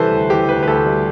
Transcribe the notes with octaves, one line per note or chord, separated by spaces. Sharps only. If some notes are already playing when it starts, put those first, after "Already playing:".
Already playing: C3 E3 G3 A4 B4 C5
D2
E3 G4
D2 B4
B4
D2 A4
G3